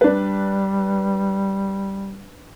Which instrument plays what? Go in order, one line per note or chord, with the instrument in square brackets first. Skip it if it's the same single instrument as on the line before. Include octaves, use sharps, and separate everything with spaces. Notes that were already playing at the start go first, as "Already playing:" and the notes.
[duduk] G3 [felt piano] D4 B4